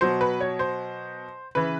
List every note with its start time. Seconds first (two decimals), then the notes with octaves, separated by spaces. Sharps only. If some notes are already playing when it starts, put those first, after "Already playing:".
0.01 B2 F#3 C5
0.21 B4
0.41 C#5
0.59 C5
1.55 C#3 E3 B4